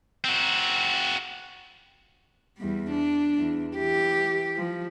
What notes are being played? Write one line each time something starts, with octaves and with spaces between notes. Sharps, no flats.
C4 F#4
E2 G3
D4
E2
E3 G4
F3